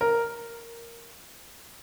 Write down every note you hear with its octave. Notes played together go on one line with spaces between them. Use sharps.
A#4